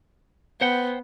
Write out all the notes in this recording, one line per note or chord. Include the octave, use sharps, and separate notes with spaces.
B3 C5 F#5 G5